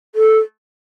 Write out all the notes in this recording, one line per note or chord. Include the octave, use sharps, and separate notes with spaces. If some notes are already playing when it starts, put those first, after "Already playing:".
A4